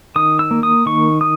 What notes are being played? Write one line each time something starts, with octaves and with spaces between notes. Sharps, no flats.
D#3 D#6
E6
A#3
D#6
D#3 C#6
D#6